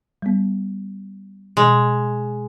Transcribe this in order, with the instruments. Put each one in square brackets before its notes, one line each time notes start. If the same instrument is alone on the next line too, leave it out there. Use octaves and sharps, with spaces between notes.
[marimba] G3 B3
[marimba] B2 [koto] G#3